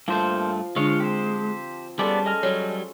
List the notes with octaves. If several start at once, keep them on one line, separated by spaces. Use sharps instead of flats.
G2 F3 A3 A#3 C5
D3 G#3 D4 F4 C#5
C4 G4 C5
G3 G#3 B3 C#4 A4 D5 D6
D#5 G#5 F6
F#3 G3 C#5